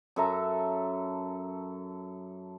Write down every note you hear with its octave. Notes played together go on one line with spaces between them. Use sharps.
F#2 A4 E5 A#5